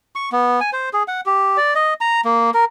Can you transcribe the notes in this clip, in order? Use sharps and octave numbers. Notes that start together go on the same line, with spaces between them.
C#6
B3
G#5
C5
G#4
F#5
G4
D5
D#5
A#5
A#3
A#4